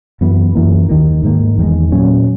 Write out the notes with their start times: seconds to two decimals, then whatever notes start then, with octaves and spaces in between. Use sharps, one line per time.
0.21 F#2 E3 B3
0.55 F#2 E3 A#3
0.89 D#2 D#3 A#3
1.23 G#2 D#3 A#3
1.58 E2 D#3 G#3
1.91 A#2 F#3 C#4